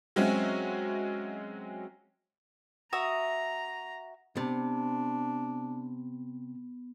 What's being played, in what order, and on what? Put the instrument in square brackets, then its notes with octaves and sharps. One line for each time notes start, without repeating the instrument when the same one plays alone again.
[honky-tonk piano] F#3 G#3 C4 C#4 F#4 E5
[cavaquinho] F#4 E5 D#6 [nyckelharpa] A#5
[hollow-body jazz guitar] C3 [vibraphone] B3 [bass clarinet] D4